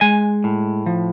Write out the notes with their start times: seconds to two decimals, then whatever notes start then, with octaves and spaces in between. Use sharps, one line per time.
0.01 G#3 G#5
0.44 A2
0.86 F3